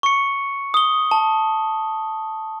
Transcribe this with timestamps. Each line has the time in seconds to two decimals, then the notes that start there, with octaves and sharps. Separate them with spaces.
0.03 C#6 C#7
0.74 D#6 G7
1.11 A5